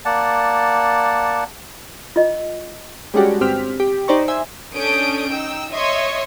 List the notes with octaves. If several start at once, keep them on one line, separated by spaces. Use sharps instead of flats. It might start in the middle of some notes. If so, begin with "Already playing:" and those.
A#3 D5 F#5 A5
F4 D#5
G3 G#3 C#4 D4 F#4 G4
G1 C4 G4 F6 B6
G4
D#4 G4 C5 D5 A#5 C#6
C5 E5 G#5
C#4 D4 A4 D#6 G6 D7
D#4 G5 E6
C#5 D#5 E5 C6 C#6 D#6